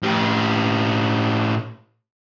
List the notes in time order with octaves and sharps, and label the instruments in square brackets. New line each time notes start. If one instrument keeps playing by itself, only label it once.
[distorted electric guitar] A2 G4